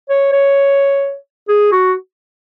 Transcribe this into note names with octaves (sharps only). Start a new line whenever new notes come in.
C#5
C#5
G#4
F#4